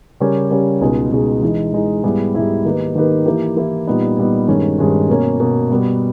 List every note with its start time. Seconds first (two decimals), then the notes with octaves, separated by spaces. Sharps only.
0.20 C#3 G3 C#4 G4 A#4
0.51 C#3 G3 C#4 G4 A#4
0.81 C#2 B2 G#3 D#4 G#4
1.12 C#2 B2 G#3 D#4 G#4
1.42 E3 G#3 D#4
1.73 E3 G#3 D#4
2.04 G#2 G3 B3 E4 G#4
2.34 G#2 G3 B3 E4 G#4
2.65 D#3 A#3 D#4 G4 B4
2.95 D#3 A#3 D#4 G4 B4
3.26 E3 A#3 E4 G4
3.56 E3 A#3 E4 G4
3.87 A#2 G3 B3 D#4
4.17 A#2 G3 B3 D#4
4.48 G2 D#3 G#3 C#4
4.78 G2 D#3 G#3 C#4
5.09 B2 A#3 C#4
5.40 B2 A#3 C#4
5.71 B2 G3 B3